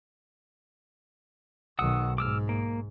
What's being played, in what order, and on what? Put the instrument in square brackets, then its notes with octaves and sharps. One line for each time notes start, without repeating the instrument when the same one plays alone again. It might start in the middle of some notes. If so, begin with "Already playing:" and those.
[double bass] B1 D#3 [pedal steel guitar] F#5 D#6 E6
[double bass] G#2 [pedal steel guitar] D6 E6 F6
[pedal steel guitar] A#3